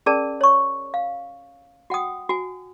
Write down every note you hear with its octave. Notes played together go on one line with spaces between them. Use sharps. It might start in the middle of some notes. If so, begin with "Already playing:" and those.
C#4 G#4 A#4 D5 A5
C#5 C#6
F5
F#4 F#5 G5 D#6
F#4 G#5